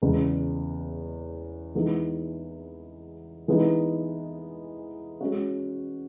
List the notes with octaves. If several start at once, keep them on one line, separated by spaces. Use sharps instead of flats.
E2 C#3 G#3
E3 G#3 B3 D#4
E3 G#3 B3 D#4
G#3 C#4 F#4